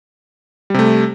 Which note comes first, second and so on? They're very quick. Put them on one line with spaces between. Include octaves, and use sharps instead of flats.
G3 C3 A3